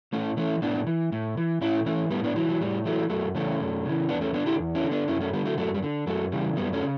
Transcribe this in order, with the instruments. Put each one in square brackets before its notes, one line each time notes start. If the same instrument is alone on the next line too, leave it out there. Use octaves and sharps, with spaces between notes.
[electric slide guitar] A2 A3 C#4
E3 A3 C#4
A2 B3 D4
E3
A2
E3
A2 C#4 E4
E3 A3 C#4
A2 G3 B3
B3 D4
E3 F#3
F#3
A2 G3
E3 F#3 A3
F#2 F#3 A3
C#3 E3 A3 C#4
F#2
C#3 E3
E2 B3 D4
A3 C#4
D3 B3 D4
E4 G4
E2
C#4 E4
D3
B3 D4
F#2 C#4 E4
A3 C#4
D3 G3 B3
F#3 A3
F#2 F#3 A3
G3
D3
F#2 F#3 A3
C#3 E3 G3
F#2 G3 B3
A3 C#4
C#3